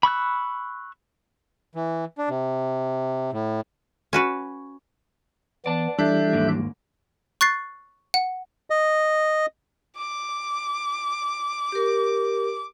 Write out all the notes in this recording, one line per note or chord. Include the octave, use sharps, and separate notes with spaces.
B5 C#6 E6 F#6
E3
D4
C3
A2
C#4 F#4 B4
E3 B3 D5 A5
E3 G3 D4 A4 E5 G6
D#2 G#2 A#3
C#6 F#6 A6 C7
F#5
D#5
D6
G4 A#4